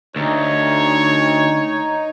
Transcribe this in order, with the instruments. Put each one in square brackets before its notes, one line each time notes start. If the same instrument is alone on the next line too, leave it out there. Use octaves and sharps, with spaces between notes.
[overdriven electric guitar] D2 [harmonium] D#4 [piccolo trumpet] C#5